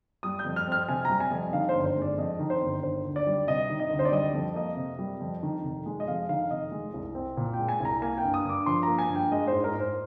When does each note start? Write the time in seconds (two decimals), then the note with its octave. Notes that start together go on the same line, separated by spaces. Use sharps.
0.23 G3 D#6
0.39 G6
0.45 F2
0.56 F6
0.67 C4 F6
0.88 C3 G#5
1.05 G3 A#5
1.20 G#5
1.31 F2
1.53 D#3 F5
1.69 C5
1.75 G1
1.85 C5
1.96 G#3
2.02 D5
2.18 F2 D#5
2.39 D#3
2.50 C5
2.62 G1
2.83 D#3 C5
3.05 D2
3.16 D5
3.27 G3
3.47 C3 D#5
3.70 D#3
3.80 D#5
3.90 D2
3.99 C5
4.05 D5
4.12 G3 D#5
4.34 F2
4.55 A#3 D#5
4.77 C3
4.99 G3
5.21 F2
5.43 D#3
5.64 F1
5.86 G#3
6.00 D#5
6.08 F2 F5
6.29 D#3 F5
6.50 F1 D#5
6.71 G#3
6.94 C2
7.15 C4
7.37 A#2
7.54 G5
7.59 G#3
7.69 G#5
7.80 C2 A#5
8.02 A#3 G#5
8.18 G5
8.23 G2
8.34 D#6
8.45 G2 D6
8.66 F3 C6
8.83 A#3 A#5
8.98 G#5
9.10 G2
9.15 G5
9.32 G#3 D#5
9.47 G#2 C5
9.64 A#4
9.74 G#2
9.80 C5